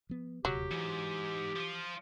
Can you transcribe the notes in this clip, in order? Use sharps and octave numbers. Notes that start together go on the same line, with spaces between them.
F3 B3
D#1 D2 C3 F#3 G4
D2 G#2 E3
F3 F4